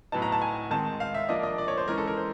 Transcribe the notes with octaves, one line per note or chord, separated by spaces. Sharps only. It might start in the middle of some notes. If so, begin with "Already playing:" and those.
A2 F#3 B3 D#4 A5
A#5
A5
G#5
D#3 G#3 C4 D#4 A5
F5
E5
F3 A#3 D4 D#5
D#5
D5
C#5
C5
E3 G#3 C#4 A#4
A4
A#4
C5